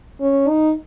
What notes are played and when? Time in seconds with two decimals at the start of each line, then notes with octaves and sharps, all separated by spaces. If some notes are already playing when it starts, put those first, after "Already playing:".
0.21 C#4
0.49 D#4